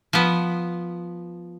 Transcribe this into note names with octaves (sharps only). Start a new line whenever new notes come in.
F3 B3